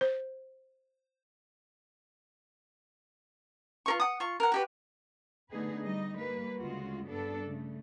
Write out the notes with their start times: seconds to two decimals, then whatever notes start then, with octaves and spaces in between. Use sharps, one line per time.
0.01 C5
3.86 F4 A#4 C#6
4.00 F#5 D#6
4.20 F4 C#6
4.40 A#4 F#5
4.52 F#4 G4 B4
5.50 D3 A3 B3 D#4 G#4 B4
5.85 G3 D#4 D#5
6.15 G3 A#3 B4
6.57 D2 C#3 G#3 F4 F#4
7.07 G2 B3 D4 A4
7.43 C#3 A3